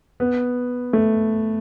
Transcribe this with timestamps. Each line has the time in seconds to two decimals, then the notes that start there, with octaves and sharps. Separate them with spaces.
0.20 B3
0.93 A3